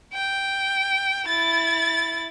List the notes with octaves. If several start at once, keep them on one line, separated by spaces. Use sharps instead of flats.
G5
E4 A6